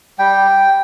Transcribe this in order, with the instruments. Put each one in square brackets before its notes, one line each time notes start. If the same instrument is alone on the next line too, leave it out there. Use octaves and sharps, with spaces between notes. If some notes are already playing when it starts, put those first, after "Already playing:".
[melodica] G3 G5